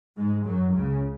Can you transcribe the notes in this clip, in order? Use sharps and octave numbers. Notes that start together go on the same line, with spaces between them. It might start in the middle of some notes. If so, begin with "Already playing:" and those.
G#2 G#3
F#2 F#3
C#2 C#3